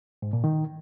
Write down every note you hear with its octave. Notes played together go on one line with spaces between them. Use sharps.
G#2
A#2
D#3